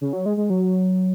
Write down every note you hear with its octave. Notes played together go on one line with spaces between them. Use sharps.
C#3
F#3
G#3
G#3
F#3